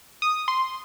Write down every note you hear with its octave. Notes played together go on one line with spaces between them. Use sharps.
D#6
C6